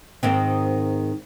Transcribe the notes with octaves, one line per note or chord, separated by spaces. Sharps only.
G#2 D#3 C4